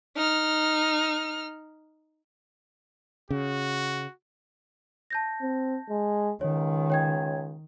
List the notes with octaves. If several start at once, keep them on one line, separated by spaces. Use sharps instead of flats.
D#4 F6
C#3 F#4
A5 G6 A#6
C4
G#3
C#2 D#3 C#5
C#5 G5 G#6